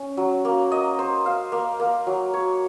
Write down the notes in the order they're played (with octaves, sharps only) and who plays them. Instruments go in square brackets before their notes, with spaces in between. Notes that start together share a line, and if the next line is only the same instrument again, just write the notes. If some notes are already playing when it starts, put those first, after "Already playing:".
Already playing: [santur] C#4
F#3
A#3
D#5
C5
F5
A#3
A#3
F#3
C#5